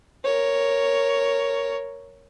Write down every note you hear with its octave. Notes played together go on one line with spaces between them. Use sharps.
A#4 C#5